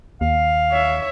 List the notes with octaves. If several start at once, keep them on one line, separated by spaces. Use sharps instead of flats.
D#2 F5
C#5 E5